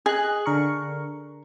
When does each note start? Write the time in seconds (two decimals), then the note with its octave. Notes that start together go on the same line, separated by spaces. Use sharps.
0.06 G#4 D#5 F#6
0.46 D3 A#4 C#6